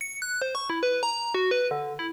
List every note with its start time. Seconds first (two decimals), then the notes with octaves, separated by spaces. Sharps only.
0.01 C#7
0.22 F#6
0.42 C5
0.55 C#6
0.70 E4
0.83 B4
1.03 A#5
1.34 F#4
1.51 B4
1.71 D3
1.99 E4